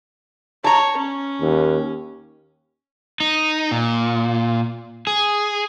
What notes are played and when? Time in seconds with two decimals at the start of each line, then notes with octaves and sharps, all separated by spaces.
0.64 C#5 A5 A#5
0.97 C#4
1.41 D#2
3.20 D#4
3.71 A#2
5.07 G#4